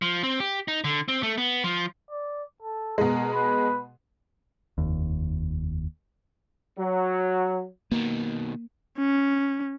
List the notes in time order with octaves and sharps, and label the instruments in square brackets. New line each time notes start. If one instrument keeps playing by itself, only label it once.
[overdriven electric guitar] F3
C4
G4
D#4
D3
C4
A3
B3
F3
[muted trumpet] D5
A4
[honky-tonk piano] B2 G#3 [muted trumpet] A#4
[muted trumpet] B4
[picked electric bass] F1 D#2
[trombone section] F#3
[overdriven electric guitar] B2 D#3 [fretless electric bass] A#3
[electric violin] C#4